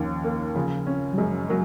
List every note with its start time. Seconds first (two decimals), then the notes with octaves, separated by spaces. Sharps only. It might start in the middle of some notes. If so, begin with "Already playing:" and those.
Already playing: D#2 D#3 F3 C#4
0.24 A#3
0.55 C#3 F3
0.87 C#4
1.13 F#3
1.18 F#2 G#3
1.49 F#3 A#3